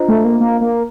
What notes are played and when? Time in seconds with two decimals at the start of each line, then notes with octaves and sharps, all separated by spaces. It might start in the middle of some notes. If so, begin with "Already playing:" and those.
Already playing: D4 F4 C5 D#5 A#5
0.08 A3
0.25 A#3
0.40 A#3
0.61 A#3